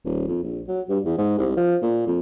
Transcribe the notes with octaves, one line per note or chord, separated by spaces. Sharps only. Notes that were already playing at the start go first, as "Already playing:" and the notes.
D#1
F2
A#1
F#3
G2
E2
G#2
C2
F3
A#2
F2